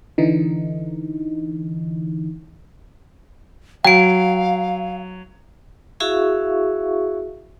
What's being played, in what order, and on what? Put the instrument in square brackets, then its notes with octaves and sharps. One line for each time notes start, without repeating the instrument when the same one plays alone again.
[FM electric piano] D3 E3 D#4
[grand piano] F#3 [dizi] F5 [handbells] G5 D7
[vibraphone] E4 F#4 G#4 E5 F5 C#6